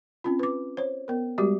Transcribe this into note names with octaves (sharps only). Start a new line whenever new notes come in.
C4 C#4 F4
B4 D6
C5 C#5
B3 A#4
G3 G#3 F#4 G4